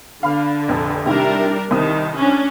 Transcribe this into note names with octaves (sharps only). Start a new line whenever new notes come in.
D3 F5 B5 F6
F1 A#1 F2
C3 D#3 G3 D4 E4 A#4
C2 D#3 C4 D#6
C#4 D4